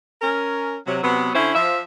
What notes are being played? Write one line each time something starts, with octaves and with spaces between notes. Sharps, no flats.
C#4 A#4
C3 F#3
C3 F#3 B3
D3 C#4 E4 C5
F3 E5